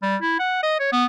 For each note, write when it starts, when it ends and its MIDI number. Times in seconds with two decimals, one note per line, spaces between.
0.03 0.16 55
0.22 0.38 64
0.39 0.63 78
0.63 0.78 75
0.80 0.89 73
0.92 1.06 59